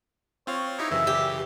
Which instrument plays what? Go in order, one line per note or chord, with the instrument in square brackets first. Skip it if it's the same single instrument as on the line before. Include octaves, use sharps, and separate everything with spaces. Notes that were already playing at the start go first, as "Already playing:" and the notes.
[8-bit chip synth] C4 F4 F5 [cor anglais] C#5
[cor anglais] D#4 [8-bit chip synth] E4 G4 C#5
[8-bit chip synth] F#2 C#3 E3 [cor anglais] E5
[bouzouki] G4